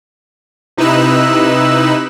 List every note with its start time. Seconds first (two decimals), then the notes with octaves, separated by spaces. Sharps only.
0.77 C3 D#4 E4 B4 E6 F#6